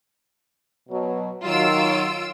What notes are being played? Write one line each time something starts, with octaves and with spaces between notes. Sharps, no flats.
B2 F#3
D#3 F#3 F4 E6 D7